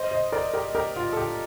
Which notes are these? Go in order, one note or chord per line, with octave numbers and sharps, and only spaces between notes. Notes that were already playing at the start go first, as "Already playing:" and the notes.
Already playing: C5 D#5
C5 D#5
A#4 D5
G4 A#4
G4 A#4
F4
A4
G4